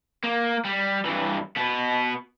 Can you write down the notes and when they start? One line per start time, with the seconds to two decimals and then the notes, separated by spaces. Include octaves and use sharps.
0.24 A#3
0.65 G3
1.05 G2 E3
1.57 B2 B3